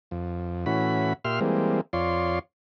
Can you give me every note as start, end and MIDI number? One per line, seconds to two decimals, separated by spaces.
0.11 0.66 41
0.66 1.13 45
0.66 1.13 52
0.66 1.13 61
0.66 1.13 66
0.66 1.13 83
1.24 1.40 46
1.24 1.40 67
1.24 1.40 76
1.24 1.40 84
1.24 1.40 89
1.41 1.81 52
1.41 1.81 55
1.41 1.81 56
1.41 1.81 58
1.41 1.81 60
1.93 2.39 41
1.93 2.39 65
1.93 2.39 73
1.93 2.39 74
1.93 2.39 84